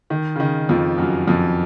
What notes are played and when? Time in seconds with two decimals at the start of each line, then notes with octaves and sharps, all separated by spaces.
0.10 D#3
0.36 C#3
0.40 D#3
0.69 F2 F3
0.98 F#2 F#3
1.27 F2 F3